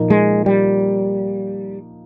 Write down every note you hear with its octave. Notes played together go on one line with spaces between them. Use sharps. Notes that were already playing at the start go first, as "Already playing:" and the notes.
Already playing: A#2 F3 A#3 D#4
G#3
G3